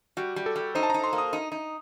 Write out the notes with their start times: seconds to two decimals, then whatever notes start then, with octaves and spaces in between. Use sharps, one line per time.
0.17 G3 F#4
0.36 G3
0.46 A4
0.56 G3
0.75 D#4 C5
0.83 A5
0.90 D#4 A#5
1.04 C6
1.13 A#3
1.18 D#6
1.33 D#4
1.52 D#4